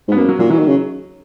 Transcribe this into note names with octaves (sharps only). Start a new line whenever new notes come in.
G#2 B3
F#2 A#3
F#3
A#2 F#3
E3 F#3
D#3
C#3